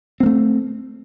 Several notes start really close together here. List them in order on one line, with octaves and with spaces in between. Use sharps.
C4 A#3 A3